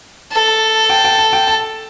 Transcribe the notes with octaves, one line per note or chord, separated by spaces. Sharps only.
A4
G5
G5
A5
G5
A5